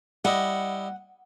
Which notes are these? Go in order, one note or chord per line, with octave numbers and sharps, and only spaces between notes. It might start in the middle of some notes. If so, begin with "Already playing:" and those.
G3 E4 D#5 F#5